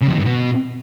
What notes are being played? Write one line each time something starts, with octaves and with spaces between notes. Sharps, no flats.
C#3
F2
D#3
G2
B2